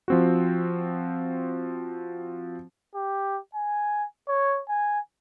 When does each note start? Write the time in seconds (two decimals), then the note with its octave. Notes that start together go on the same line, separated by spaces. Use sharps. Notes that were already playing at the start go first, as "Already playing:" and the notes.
0.08 F3 C4 F#4
2.95 G4
3.55 G#5
4.29 C#5
4.69 G#5